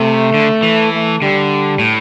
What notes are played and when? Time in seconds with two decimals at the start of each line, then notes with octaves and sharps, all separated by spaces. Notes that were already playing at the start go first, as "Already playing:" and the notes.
Already playing: C3 A3
0.34 D3
0.63 E3
0.92 A3
1.21 D3 G3
1.79 A2